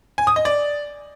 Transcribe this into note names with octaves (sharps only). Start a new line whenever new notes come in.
G#5
D#6
D#5
D5